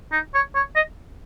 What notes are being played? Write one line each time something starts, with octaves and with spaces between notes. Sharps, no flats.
D#4
C#5
C#5
D#5